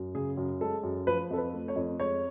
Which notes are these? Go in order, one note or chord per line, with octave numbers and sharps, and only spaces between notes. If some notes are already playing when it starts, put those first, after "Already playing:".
Already playing: F#2
C#3 G#4
F#2
G#3 A4
F#2
F3 B4
F2 A4
B4
A3
C#5
F2
G#3 C#5